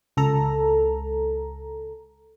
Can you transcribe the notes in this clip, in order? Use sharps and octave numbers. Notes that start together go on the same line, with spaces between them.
C#2 A4 A#5